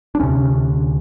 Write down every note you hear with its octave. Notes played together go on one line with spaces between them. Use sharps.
D4
D2 C3 C#4